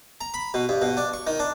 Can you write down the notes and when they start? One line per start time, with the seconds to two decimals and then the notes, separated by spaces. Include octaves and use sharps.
0.21 A#5
0.34 B5
0.54 B2
0.69 G2
0.82 B2
0.97 D4
1.13 C#6
1.27 D#3
1.39 D4